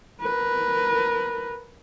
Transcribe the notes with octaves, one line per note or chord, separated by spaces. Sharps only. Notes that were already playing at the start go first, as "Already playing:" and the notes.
A#4 B4